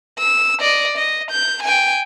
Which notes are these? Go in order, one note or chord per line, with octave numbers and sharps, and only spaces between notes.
E6
D5 D#5
D#5
G6
G5 G#5